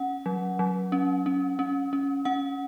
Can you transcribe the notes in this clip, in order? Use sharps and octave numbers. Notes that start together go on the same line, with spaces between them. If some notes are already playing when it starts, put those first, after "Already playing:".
Already playing: C#4 F#5
F#3
F#3
C#4
C#4
C#4
C#4
C#4 F#5